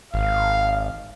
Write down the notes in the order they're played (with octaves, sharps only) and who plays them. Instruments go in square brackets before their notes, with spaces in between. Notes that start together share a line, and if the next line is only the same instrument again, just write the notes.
[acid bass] G#1 [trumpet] F5